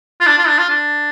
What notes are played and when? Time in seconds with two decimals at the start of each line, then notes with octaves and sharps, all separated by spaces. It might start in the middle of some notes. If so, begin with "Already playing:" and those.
0.20 F4
0.27 D4
0.38 F4
0.48 D4
0.58 F4
0.70 D4